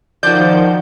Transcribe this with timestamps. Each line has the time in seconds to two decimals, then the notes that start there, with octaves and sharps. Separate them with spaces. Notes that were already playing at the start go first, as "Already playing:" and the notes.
0.23 D#3 F3 F#4 D5 G6